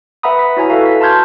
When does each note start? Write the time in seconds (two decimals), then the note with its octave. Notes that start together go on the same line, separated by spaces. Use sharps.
0.23 B4 E5 F#5 A#5 B5 D#6
0.39 B6
0.57 E4 F#4 C#5 G#5 A#5
0.70 F#4 A4 B4 E5 F5 A#5
0.86 B6
1.01 A5 A#5 C6 F6 G6 G#6